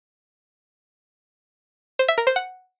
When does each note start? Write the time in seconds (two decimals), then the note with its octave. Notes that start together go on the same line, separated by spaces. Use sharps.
1.99 C5
2.08 E5
2.18 A#4
2.27 C5
2.36 F#5